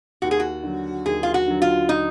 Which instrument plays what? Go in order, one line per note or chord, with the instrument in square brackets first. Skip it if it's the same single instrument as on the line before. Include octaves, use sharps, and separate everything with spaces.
[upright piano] D#2 [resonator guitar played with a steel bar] F#4
[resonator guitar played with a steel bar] G#4
F#4
[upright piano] D3 F#3
[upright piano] D#2 [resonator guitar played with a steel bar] G#4
[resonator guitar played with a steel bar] F4
F#4
[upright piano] D3 F#3
[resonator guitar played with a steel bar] F4
D#4